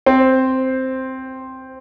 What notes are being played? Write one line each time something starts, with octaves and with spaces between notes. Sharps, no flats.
C4 C5